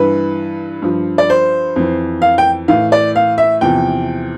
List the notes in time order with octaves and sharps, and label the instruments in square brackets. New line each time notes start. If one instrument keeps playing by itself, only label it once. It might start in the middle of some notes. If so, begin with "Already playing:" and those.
Already playing: [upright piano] G2 E3 B4
G2 F3
D5
C5
F2 E3
F5
G5
A2 E3 F5
D5
F5
E5
E2 C3 F3 G5